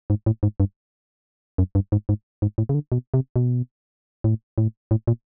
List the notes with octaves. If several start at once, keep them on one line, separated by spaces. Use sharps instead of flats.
G#2
A2
G#2
G2
F#2
G2
G#2
G#2
G#2
A2
C#3
D3
B2
C3
B2
A2
A2
A2
A#2